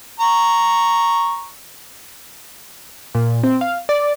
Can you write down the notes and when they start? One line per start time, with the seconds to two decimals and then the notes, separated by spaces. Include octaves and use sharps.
0.20 A#5 C#6
3.15 A#2
3.43 C4
3.61 F5
3.89 D5